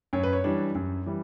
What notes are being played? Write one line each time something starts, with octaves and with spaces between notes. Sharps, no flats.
F#2 C#5
B4
C#5
E3 G3 D4
F#2
E3 G3